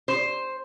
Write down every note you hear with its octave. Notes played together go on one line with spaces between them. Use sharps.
C5